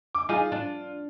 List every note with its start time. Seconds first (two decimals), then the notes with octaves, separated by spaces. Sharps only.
0.15 D6
0.29 D#4 F4 G#4
0.52 D4